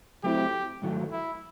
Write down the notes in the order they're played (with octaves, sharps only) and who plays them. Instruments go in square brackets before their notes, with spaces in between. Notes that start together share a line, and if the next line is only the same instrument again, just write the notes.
[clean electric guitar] F#3 A3 C4 E4 [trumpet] G4
[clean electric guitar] G#2 D#3 F#3 A3
[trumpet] E4